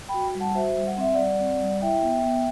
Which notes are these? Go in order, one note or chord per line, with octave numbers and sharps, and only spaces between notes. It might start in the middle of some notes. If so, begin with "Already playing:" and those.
G5 B5
F#4
G3
F#5 A5
F#4 C5 E5
G3
F#5
C4 E5
G3 D5 F#5
C4
G3
E4 E5 G5
B3
B3